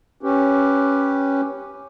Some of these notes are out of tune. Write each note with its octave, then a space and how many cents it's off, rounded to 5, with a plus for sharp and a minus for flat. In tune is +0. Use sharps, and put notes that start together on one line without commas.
C#4 +0 G4 +0 B4 +0